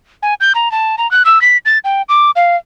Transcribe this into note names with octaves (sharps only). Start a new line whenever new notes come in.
G#5
G6
A#5
A5
A#5
F#6
E6
B6
A6
G5
D6
F5